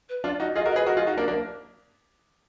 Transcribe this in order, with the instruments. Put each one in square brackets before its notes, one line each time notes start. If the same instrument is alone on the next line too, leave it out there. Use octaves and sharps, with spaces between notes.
[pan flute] B4
[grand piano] D4 F4 [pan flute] D5
[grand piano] D#4 F#4 [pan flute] D#5
[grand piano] F4 G#4 [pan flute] D#5
[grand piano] F#4 A#4
[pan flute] D#5
[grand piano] G#4 B4
[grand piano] F#4 A#4 [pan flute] D#5
[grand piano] F4 G#4
D#4 F#4
A#3 D4
A#3 D4